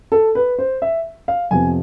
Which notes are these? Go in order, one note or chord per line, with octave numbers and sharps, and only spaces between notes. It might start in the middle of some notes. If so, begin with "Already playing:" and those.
A4
B4
C5
E5
F5
F2 C3 F3 B3 G#5